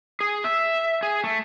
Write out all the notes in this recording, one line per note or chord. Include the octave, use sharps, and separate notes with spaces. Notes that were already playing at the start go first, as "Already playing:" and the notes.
G#4
E5
G#4
A3